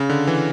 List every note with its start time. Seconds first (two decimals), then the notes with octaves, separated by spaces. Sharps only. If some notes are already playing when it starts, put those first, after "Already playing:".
Already playing: C#3
0.09 D3
0.27 E3